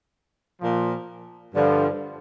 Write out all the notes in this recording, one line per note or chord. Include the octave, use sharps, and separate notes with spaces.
A#2 F3
G2 D3 F3